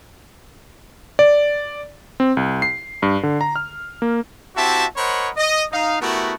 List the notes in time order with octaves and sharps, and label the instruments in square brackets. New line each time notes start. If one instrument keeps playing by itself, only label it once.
[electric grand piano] D5
C4
C2
C7
G2
D3
A#5
F6
A#3
[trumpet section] C4 E4 F#4 G4 E5 A5
A#4 C5 C#5 D#5 F#5 B5
D#5
D#4 F5
A3 B3 E4 F#4 G4 A#4